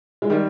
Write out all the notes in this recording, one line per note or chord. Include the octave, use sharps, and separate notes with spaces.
G#3
D#3 G3